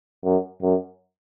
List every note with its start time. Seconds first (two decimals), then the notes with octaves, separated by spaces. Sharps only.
0.24 F#2
0.62 F#2